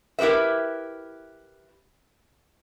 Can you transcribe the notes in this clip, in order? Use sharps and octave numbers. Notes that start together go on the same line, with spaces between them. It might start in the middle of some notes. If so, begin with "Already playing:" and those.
E4 G4 A#4 B4 E5